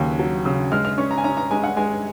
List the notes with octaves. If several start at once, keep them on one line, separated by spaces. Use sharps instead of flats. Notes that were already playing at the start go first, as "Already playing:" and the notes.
Already playing: D#2 C#3 F#3
F#3
C#3
G#3 F6
F6
C#4 C#6
A#5
G#5
C#4 A#5
A#5
G#3 G#5
F#5
G#3 G#5